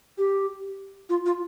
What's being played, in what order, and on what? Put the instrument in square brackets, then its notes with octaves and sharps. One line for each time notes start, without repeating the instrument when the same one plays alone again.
[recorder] G4
F4
F4